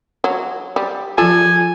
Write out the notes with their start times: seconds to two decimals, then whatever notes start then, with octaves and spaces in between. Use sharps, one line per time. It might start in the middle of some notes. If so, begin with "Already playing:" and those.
0.24 F#3
0.76 G3
1.18 F3 F4 A4 G#5